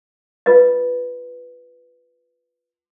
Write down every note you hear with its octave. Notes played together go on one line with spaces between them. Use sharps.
F4 B4 D#5